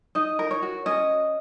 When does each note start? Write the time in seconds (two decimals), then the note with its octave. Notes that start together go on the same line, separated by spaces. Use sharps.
0.15 D#4 D#5
0.39 A#4
0.51 C#5
0.63 F#4
0.86 C#4 D#5